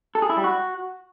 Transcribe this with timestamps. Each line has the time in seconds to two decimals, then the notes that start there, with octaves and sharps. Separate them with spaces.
0.15 A4
0.22 G#4
0.29 E4
0.37 G3
0.44 F#4